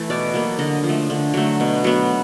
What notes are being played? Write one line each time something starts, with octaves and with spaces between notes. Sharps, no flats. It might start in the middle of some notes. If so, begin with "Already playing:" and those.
Already playing: E3 A3
B2 D5
F#3 A#3
D3 D#5
F3
A3
D3
F#3 A3
B2
F#3 B3